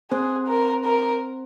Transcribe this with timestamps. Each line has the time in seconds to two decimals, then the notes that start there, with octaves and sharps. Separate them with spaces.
0.11 C4 G#4 C5
0.48 A#4
0.85 A#4